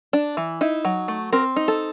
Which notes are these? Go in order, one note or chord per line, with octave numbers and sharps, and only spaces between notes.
D4
E3
D#4 E4
F#3
A3
C4 A#4
D#4
A4